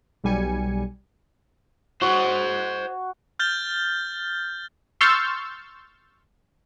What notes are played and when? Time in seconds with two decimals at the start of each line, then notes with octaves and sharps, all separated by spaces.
0.24 B1 G3 G#5 C#7
2.02 F#4 C5 D#5
3.39 F6 G6 A6 G7
5.01 C6 C#6 E6 F6 G6 A6